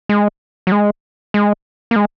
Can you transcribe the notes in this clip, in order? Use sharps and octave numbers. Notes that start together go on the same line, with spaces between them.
G#3
F#3
G#3
G#3
A#3
G#3